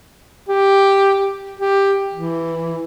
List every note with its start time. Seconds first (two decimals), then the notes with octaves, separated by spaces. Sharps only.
0.49 G4
1.59 G4
2.14 E3